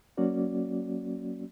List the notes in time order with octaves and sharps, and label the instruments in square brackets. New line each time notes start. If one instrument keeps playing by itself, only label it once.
[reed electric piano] F#3 A#3 C#4 F#4 D5